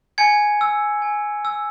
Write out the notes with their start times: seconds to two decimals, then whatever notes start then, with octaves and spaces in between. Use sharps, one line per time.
0.18 G#5 G#6 C#7
0.61 E6
1.02 G#5
1.45 E6